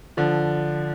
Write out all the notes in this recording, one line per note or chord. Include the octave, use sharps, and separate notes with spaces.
D3 F3